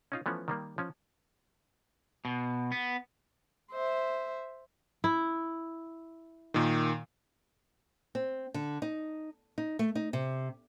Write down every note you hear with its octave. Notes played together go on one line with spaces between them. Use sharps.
C#4 D#4 F4
E3 F3 A3 B3 C#4
D#3 G3 A#3
F3 C#4
B2
B3
C5 E5
E4
A#2 D#3
C4
D3
D#4
D#4
A3
D#4
C3